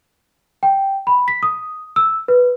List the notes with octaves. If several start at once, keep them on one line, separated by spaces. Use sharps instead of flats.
G5
B5
B6
D#6
E6
B4